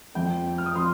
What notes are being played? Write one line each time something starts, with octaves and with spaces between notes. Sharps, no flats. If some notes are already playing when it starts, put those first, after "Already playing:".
F2 F3 C4 G5
F6
D#6
F3 C4 C6